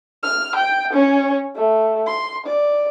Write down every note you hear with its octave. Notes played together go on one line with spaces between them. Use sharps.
F6
G5
C#4 C#5
A3
C6
D5